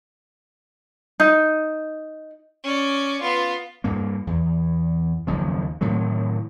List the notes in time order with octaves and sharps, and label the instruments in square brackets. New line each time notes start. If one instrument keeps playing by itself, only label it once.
[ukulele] D#4
[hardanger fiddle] C#4 D5
B3 F4
[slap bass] G2 A#3
E2
F#1 D#2 F3
A2 C3 D#3 F#3